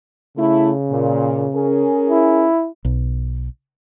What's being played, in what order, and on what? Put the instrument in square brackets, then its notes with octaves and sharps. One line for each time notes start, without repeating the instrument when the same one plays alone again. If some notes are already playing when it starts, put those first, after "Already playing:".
[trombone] C#3 [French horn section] A3 E4
[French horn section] A#2
C#4 G#4 A#4
[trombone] E4
[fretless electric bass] B1